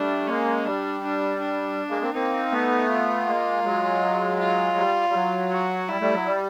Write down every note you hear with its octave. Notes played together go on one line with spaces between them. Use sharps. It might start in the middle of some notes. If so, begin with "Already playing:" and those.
Already playing: G3 A3 D4
G#3 A#3 C#4
G3 D4
D4
D4
G#3 A#3
A#3 C4
A#3 C4 D#4
A3 B3
F4
G#3 A#3
F#3 G#3
F4
G3
G3
F#3
F#4
G3 E4
G3 A3
F#3
G3